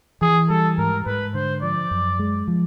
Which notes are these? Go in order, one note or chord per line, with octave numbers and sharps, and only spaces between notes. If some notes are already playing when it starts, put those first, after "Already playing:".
E3 G#4
G3 A4
G#2 A#4
G#2 B4
D3 C5
F3 D5
F#2
G#3
F3